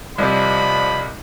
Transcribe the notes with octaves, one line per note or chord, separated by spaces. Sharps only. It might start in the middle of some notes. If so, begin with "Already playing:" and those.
C2 C3 F3 D5 D#5 B5